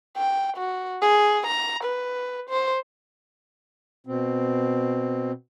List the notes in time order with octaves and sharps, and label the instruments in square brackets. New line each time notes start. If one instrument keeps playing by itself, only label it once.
[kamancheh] G5
F#4
G#4
A#5
B4
C5
[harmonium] B2 C4